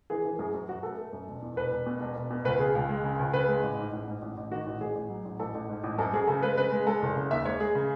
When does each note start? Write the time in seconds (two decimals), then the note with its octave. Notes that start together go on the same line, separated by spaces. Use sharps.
0.10 E3 G#4
0.25 E3
0.39 F#2 G#4
0.54 F#2
0.69 F#2 F#4
0.83 A3 A4
0.98 A3
1.13 F#2
1.28 E1
1.42 E2
1.56 E1 B4
1.71 E1
1.86 B2
2.01 E1
2.16 E1
2.30 B2
2.45 C#2 B4
2.60 C#3 G#4
2.75 C#2
2.89 G#3
3.04 C#3
3.19 C#2
3.33 C#3 B4
3.48 G#3
3.63 A1
3.78 G#2
3.93 A1
4.08 G#2
4.22 A1
4.37 A1
4.51 D#3 F#4
4.67 A1
4.81 A1 G#4
4.95 A1
5.10 F#3
5.25 A1
5.39 A1 A4
5.55 A1
5.69 G#2
5.84 A1
5.98 F#2 A4
6.14 F#2 G#4
6.27 C#3 A4
6.43 G#3 B4
6.57 C#3 B4
6.71 G#3
6.87 G#3 A4
7.02 F#1
7.16 C#3
7.31 D#2 E5
7.45 G#3 C#5
7.60 G#3 G#4
7.75 C#3